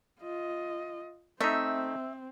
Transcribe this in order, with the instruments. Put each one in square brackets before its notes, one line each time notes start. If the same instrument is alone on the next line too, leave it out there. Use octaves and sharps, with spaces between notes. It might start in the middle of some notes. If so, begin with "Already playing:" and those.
[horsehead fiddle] F4 D#5
[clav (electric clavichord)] A3 D#4 [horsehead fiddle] C4 [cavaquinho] E5